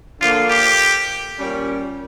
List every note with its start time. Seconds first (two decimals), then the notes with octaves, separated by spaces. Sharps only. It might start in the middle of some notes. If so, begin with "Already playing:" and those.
0.20 D3 F3 A#3 F4
0.50 G4
1.38 A#2 G3 C#4